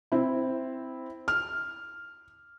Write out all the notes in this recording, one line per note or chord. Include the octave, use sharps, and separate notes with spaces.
C4 E4
F6